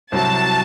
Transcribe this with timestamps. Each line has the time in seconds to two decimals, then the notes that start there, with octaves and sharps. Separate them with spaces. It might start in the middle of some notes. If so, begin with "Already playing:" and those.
0.12 C2 C3 F#3 A5